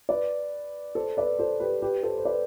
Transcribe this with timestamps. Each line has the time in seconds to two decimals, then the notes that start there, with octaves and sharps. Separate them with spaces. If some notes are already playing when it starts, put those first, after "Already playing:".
0.09 B4 D5
0.95 A4 C5
1.17 B4 D5
1.39 A4 C5
1.60 G4 B4
1.82 G4 B4
2.03 A4 C5
2.18 C5
2.25 B4 D5